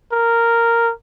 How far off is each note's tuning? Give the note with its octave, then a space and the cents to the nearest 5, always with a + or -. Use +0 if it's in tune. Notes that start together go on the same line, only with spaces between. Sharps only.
A#4 -5